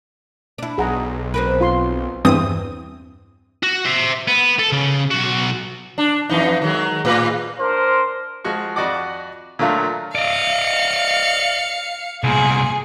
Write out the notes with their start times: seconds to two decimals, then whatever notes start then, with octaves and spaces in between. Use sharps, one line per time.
0.58 D4 E4
0.78 B1 G#4 F#5 A#5
1.34 C4 A#4 B4
1.61 F4 C6
2.25 E2 G2 E3 C4 D#6
3.63 F#4
3.85 C5 E5
4.28 B3
4.59 A4
4.72 C#3
5.11 B1 F#4
5.98 D4
6.29 F2 E3 D#4
6.62 D#3 F#3 G#3
7.05 A2 B4
7.60 D4 A#4 C5
8.45 F3 G#3 F#4 C#6
8.76 F2 F#4 D5 D#5 F#5 D6
9.59 A#2 D3 F#3 A3 F4
10.15 D5 D#5 F5 C#7
12.24 C2 A#2 G#4